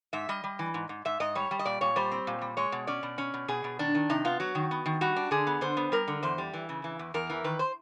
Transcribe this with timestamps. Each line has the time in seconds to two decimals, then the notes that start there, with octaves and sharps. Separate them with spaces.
0.13 G#2 E5
0.29 G3 D#5
0.44 G3
0.59 E3
0.74 G#2
0.89 G#2
1.05 G#2 E5
1.20 G#2 D#5
1.35 G3 C#5
1.51 G3
1.59 D#5
1.65 A#2 D5
1.81 A#2 C#5
1.96 G3 C5
2.12 C4
2.27 A#2
2.42 G3
2.57 G#3 C#5
2.72 B2
2.87 C#4 D5
3.03 B2
3.18 C#4
3.34 B2
3.48 B2 G#4
3.64 B2
3.79 D#3 D4
3.95 D#3
4.10 C3 D#4
4.25 B3 F4
4.40 F#3 F#4
4.55 D#3
4.71 B3
4.86 D#3
5.01 G3 F#4
5.16 D4
5.31 D3 G#4
5.47 B3
5.61 D3 C5
5.77 B3
5.92 G3 A#4
6.08 D3
6.23 E2 C5
6.38 G3
6.54 E3
6.69 C#3
6.84 E3
6.99 E2
7.14 E2 A#4
7.30 E3
7.44 D#3 B4
7.59 C5